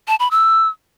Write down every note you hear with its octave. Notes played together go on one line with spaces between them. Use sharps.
A5
B5
E6